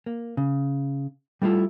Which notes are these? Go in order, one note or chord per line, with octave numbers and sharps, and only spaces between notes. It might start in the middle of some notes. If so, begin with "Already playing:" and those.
A#3
C#3
G3 A3 D4 E4 F4 A4